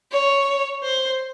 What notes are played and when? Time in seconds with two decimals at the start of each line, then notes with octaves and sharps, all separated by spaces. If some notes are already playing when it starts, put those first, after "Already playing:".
0.12 C#5
0.83 C5